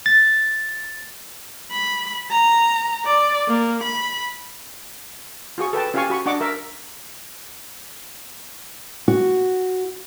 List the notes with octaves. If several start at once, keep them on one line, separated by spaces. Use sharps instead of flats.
A6
B5
A#5
D5
A#3
B5
F4 F#4 G#4 C#6
A4 B4 G5 A5
C#4 F4 G4 F5 G#5 C#6
F#4 B5 C#6
D4 D#5 F#5 C#6 D6
A#4 E5
F#4